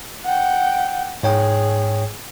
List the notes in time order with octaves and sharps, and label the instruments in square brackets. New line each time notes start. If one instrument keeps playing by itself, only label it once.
[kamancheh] F#5 G5
[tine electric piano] G#2 C#5 G5 [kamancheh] G#4